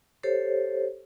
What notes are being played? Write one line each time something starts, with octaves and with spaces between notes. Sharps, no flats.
G4 A4 C5 C#5